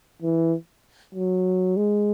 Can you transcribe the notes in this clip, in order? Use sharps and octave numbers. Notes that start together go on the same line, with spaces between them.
E3
F#3
G#3